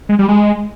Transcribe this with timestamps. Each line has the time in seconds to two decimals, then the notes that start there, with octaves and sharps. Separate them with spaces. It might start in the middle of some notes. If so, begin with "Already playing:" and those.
0.09 G#3
0.19 G3
0.28 G#3